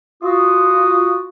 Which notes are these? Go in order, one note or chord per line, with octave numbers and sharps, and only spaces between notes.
F4 F#4 D#6